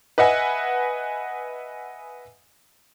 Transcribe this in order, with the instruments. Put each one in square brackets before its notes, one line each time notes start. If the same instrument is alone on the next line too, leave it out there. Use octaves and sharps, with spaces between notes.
[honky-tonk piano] B4 D#5 E5 F#5 G#5